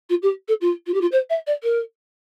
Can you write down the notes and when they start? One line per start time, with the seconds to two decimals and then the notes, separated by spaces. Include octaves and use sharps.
0.09 F4
0.22 G4
0.48 A4
0.61 F4
0.86 F4
0.94 G4
1.01 F4
1.12 C5
1.30 E5
1.47 D5
1.63 A#4